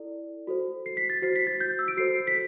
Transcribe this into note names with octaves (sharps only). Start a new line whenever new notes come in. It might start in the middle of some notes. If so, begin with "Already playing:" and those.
Already playing: E4 A4 D5
F#4 A4 C5
C7
B6
A6
F#4 C5 C7
B6
A6
G6
E6
D7
F#4 A4 C5 C7
B6